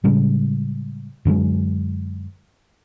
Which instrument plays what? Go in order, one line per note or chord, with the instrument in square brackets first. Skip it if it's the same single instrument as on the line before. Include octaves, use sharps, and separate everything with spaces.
[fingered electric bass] A2 C#3 G3 G#3
F#2 D3 F#3 G#3